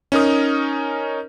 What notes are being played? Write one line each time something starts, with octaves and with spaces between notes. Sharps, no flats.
C#4 D#4 A#4 D#6